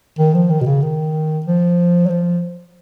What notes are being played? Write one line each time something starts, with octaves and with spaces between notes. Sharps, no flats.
D#3
F3
D#3
B2
C#3
D#3
F3
F#3
F3